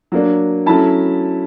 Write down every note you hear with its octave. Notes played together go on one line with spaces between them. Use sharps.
F#3 A#3 D4
F#3 A3 C#4 E4 A5 B5